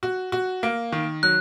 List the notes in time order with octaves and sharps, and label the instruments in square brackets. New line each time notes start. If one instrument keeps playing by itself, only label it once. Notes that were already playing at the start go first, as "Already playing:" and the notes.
[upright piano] F#4
F#4
A#3
D#3
[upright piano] F#3 [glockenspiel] F#6